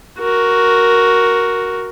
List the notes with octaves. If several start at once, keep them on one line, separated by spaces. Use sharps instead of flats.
F#4 A#4